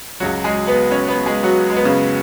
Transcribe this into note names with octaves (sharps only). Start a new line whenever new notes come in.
C#2 C#3 F#3 F#4
G#3 G#4
B3 B4
C#4 C#5
B3 B4
G#3 G#4
F#3 F#4
G#3
B3
C#3 C#4